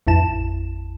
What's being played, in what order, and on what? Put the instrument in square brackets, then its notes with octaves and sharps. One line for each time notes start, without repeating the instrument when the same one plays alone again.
[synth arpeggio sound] A1 F2 E4 A5 E7